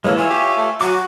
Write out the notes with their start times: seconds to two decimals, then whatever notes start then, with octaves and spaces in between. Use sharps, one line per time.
0.04 E3 G#3 A#3 A4 C#5
0.18 F4 C#5 E5 G#5
0.30 G4
0.57 A3
0.81 F#3 F#4 G#5 D6